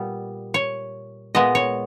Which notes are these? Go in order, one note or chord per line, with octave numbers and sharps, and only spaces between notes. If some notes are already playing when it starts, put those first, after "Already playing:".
Already playing: A#2 G3 B3
C#5
A#2 G#3 B3 D#5
C#5